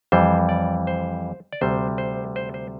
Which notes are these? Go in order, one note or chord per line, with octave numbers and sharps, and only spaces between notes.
F2 E3 G3 C5
D5
C5
D5
D2 C3 G3 C5
C5
C5
C5